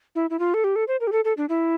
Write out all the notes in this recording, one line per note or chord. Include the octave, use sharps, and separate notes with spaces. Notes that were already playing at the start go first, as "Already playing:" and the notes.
E4
E4
F4
A4
G4
A4
C5
A#4
G4
A4
A4
D4
E4